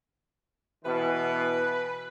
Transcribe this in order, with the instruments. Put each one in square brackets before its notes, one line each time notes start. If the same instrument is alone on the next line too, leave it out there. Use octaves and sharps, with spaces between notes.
[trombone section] B2 E3 [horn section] B4